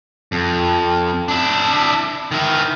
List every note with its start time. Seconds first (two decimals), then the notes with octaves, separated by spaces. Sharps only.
0.32 F2
1.28 D4 E4
2.32 D#3 E4